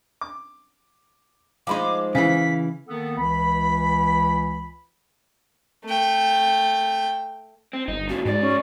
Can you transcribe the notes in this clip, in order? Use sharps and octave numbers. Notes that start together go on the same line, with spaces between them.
D6
F3 G#3 D#4 F5 B5 C6 D6
C#3 E3 F5 B6
D#3 A#3 B3 A4
C#2 E3 B5
A3 G5
C4
G1 D#4
F#2 A#2 F#4
F2 G#2 F#4 D5
C#4